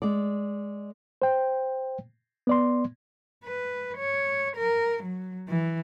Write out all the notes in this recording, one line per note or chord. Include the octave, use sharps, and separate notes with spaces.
G#3 D5
C5 G5
B3 D5 C6
B4
C#5
A#4
F#3
E3